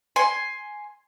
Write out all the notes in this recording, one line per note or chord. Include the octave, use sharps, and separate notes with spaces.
G#5 C6